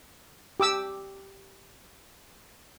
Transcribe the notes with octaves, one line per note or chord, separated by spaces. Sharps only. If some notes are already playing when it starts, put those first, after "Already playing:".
G4 D6 E6